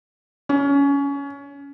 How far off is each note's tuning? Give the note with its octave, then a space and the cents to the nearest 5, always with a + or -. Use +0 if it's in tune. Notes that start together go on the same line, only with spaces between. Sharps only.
C#4 +20